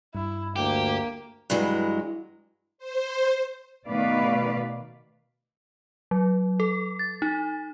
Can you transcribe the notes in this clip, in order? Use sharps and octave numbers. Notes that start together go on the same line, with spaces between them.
G2 E4
D2 A#3 G4
G2 E3 F#3 G#3
C5
B2 D#3 A3 B4 D5 F5
F#3
A4
A6
D#4